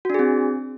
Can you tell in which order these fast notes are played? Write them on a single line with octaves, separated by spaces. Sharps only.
F#4 D4 G#4 C4